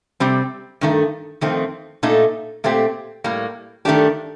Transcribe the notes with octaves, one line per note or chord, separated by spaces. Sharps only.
C3 G3 C4
G2 D#3 A3
F2 D#3 A3 C4
A#2 A3 D#4 A4
A#2 A3 C4 G4
A2 G3 A#3
G2 D#3 A3 D4 G4